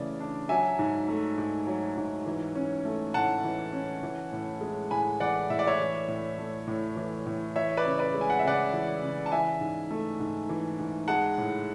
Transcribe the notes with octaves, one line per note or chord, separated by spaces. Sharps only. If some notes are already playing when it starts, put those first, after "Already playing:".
Already playing: C#3 E3 A3 D5
D4
F#3 E5 G#5
G#2
A3
G#2
F#3
G#2
E3
C#4
A3
A2 F#5 A5
E3
C#4
E3
A2
G#3
A2 G#5 B5
E3 D5 F#5
A2 E5
D5
C#5 E5
E3
A2
A3
A2
E3
A2
E3 C#5 E5
B4 D5
C#3
B4 D5
G#3
G#5
F#5
E5
C#3 D5 F#5
E3
C#3
A5
E3 E5 G#5
G#2
A3
G#2
E3
G#2
G#3 F#5 A5
A2